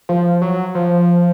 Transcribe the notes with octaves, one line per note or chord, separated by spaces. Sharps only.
F3
F#3
F3